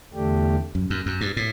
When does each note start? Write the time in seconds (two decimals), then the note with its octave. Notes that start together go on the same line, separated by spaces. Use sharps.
0.13 E2 D3 A3 D4 G4
0.75 F#2
0.90 F#2
1.06 F#2
1.21 G2
1.37 A2